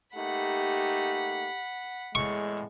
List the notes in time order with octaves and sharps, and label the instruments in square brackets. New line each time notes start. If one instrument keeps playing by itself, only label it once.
[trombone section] A3 A#3 D#4 [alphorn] G4 [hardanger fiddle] F#5 B5
[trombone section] E2 A2 [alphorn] G#3 [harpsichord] C#6